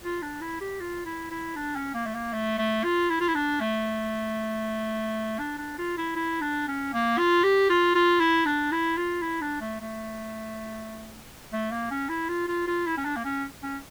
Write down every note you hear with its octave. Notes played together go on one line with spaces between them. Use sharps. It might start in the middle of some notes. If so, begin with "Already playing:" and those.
F4
D4
E4
G4
F4
E4
E4
D4
C#4
A#3
A3
A#3
A3
A3
F4
E4
F4
E4
D4
A3
D4
D4
F4
E4
E4
D4
C#4
A#3
F4
G4
F4
F4
E4
D4
E4
F4
E4
D4
A3
A3
A3
A#3
C#4
E4
F4
F4
F4
E4
C#4
D4
A#3
C#4
C#4